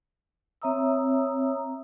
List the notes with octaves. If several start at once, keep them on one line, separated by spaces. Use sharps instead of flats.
C4 C#5 E5 A#5 D#6 E6